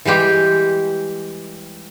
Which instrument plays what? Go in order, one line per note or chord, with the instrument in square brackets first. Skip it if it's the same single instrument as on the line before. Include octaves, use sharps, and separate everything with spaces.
[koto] E3 G3 G#3 G4